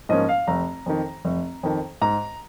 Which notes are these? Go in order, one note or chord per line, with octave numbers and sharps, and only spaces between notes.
G#2 F3 A#3 C#4 D#5
F5
F1 A#5
F2 D#3
F1
F2 D#3
G#2 A#5